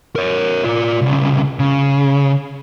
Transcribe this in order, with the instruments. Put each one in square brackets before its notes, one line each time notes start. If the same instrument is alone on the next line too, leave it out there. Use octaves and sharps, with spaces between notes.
[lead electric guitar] A#4 C#5
F4 D5
C2 C#3
C#3